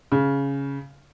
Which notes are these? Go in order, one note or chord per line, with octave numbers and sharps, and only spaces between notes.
C#3